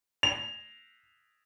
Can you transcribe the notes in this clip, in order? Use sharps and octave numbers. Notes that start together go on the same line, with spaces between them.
F7